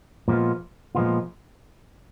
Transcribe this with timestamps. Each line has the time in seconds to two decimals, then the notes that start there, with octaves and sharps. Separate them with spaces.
0.28 A#2 F3 G#3 B3 F4
0.95 A#2 F3 G#3 B3 F4